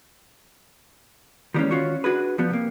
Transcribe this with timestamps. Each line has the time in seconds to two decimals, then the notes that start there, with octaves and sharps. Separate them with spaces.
1.54 D#3 E3 G3 G#3 A#3 C#4
1.71 D#3 C#4 F4 F#4 C#5
2.04 D4 F#4 G#4 B4
2.38 F3 G3 B3
2.50 C3 A#3